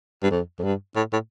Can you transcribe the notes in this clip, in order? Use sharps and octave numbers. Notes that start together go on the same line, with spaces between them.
G2
F2
F2
G2
A2
A2